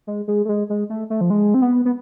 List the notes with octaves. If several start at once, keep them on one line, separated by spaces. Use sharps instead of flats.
G#3
G#3
A3
G#3
G#3
A3
A3
F3
G#3
C4
B3
B3